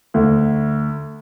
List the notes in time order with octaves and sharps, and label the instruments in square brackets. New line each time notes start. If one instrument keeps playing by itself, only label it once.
[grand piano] D2